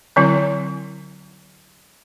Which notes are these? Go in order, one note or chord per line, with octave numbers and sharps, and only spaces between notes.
D3 F#3 C4 E4